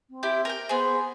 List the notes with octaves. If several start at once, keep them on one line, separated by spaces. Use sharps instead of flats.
C4
E4 G4 G6
A#4 G5
B3 G#4 C5